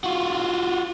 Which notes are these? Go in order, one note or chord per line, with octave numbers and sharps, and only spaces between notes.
F4 F#4